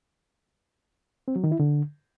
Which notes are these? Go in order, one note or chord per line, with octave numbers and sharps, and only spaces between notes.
C4
F#3
D#3
E4
D3